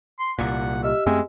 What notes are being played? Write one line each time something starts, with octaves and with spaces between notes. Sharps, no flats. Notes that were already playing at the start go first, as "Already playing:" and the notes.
C6
C2 A#2 F#5
G4 D#5 E5 F6
F#2 G#3 A3 C4 E5